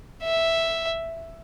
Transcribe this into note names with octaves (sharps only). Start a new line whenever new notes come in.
E5